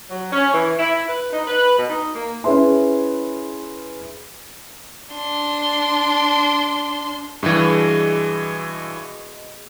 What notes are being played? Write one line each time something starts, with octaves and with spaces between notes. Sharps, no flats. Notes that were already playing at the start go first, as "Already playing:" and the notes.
F#3
C#4
E3
E4
B4
D#4
B4
B2
D#4
A#3
C#4 E4 G#4 B4 E5 C6
D4 C6
G2 B2 E3 G#3